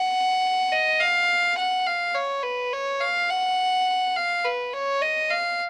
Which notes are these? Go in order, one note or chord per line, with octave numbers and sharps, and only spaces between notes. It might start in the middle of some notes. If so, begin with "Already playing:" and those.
Already playing: F#5
D#5
F5
F#5
F5
C#5
B4
C#5
F5
F#5
F5
B4
C#5
D#5
F5